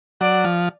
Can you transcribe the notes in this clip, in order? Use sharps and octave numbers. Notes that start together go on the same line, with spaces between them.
F#3 D5
F3